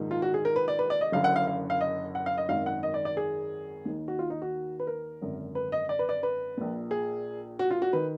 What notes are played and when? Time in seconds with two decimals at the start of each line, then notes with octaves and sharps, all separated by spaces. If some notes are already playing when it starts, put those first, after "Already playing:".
Already playing: A#1 G#2 D#3
0.11 F4
0.22 F#4
0.34 G#4
0.45 A#4
0.56 B4
0.68 D5
0.79 B4
0.90 D5
1.01 D#5
1.12 F#1 F#2 D3 F5
1.24 F#5
1.36 F5
1.47 F5
1.70 F5
1.81 D#5
2.15 F#5
2.26 F5
2.38 D#5
2.49 G#1 F#2 D#3 F5
2.66 F#5
2.83 D#5
2.94 D5
3.05 D5
3.17 G#4
3.85 D#2 D#3
4.08 F#4
4.19 F4
4.30 D#4
4.42 F#4
4.80 B4
4.87 A#4
5.21 G#1 F#2 D3
5.55 B4
5.72 D#5
5.89 D5
5.99 B4
6.09 D5
6.23 B4
6.57 A#1 A#2
6.91 G#4
7.59 F#4
7.71 F4
7.82 F#4
7.93 D#3 B4